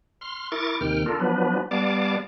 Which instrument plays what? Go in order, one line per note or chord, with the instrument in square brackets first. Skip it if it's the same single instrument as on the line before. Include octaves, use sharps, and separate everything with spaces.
[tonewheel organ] C6 F6
E4 A#4 C#6 D6 A6
D#2 C3 D#3 G5 F6
D4 F4 A4 A#4
F3 F#3 B3 D4 B4
G3 B3 D5 F5 A5 D6